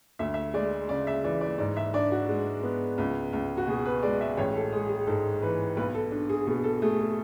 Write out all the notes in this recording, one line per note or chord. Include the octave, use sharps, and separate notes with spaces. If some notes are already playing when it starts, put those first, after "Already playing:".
D2 E5
E5
G#3 D5
C#3 D5
E5
E3 D5
D5
G#2 D5
E5
D4 D5
F#4
G#3
B3
C#2
C#2
F#4
B2 G#4
B4
G#3 D5
E5
A1 C#5
A4
G#3 G#4
G#4
G#2 A4
E3 B4
B1 B4
A4
D4
G#4
B2 G#4
A4
A3 G#4
G#4